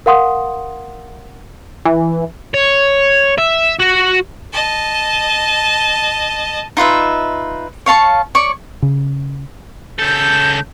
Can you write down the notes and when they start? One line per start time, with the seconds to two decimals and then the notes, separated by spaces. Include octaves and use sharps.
0.06 A#4 F5 F#5 C6 D#6
1.85 E3
2.54 C#5
3.38 E5
3.80 F#4
4.53 D#5 A5
6.77 D#4 F4 B4 E5
7.86 C#5 F5 A5 C#6
8.35 C#5 D5 C#6
8.82 C#3
9.99 C#2 A4 G6